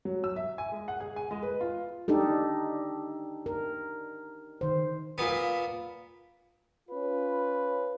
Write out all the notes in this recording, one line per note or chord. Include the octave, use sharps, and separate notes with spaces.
F#3
E6
E5
G#5
G#3
F#5
G#4
G#5
G#3
B4
F4
D4 D#4 G4 A4
A#4
D#3 C5
A#2 B3
C#4 F4 B4